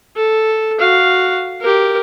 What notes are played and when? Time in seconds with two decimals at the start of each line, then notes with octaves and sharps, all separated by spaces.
0.16 A4
0.79 F#4 F5
1.61 G4 A#4